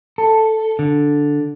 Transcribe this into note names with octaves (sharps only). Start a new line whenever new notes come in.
A4
D3